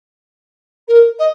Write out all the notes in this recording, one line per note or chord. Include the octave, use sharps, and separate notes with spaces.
A#4
D#5